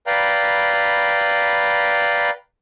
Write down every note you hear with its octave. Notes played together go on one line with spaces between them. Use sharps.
B4 D5 F5 G5 A#5 B5